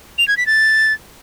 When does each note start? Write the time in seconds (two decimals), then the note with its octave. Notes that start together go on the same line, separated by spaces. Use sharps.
0.18 F7
0.28 G#6
0.37 B6
0.47 A6